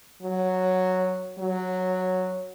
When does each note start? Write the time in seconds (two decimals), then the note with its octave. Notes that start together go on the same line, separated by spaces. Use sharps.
0.22 F#3
1.38 F#3